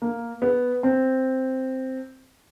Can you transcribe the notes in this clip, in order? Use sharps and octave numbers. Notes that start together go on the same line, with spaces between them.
A#3
B3
C4